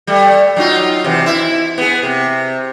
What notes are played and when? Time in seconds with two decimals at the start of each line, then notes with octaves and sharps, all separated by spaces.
0.07 G3 A3
0.56 F#3 D#4 F4
1.04 C3 E3
1.26 E4
1.78 B3 G#4
2.03 C3